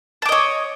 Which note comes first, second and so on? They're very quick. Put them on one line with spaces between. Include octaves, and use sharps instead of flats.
A5 D6 D#5 C#5